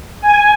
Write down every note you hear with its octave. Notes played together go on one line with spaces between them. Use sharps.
G#5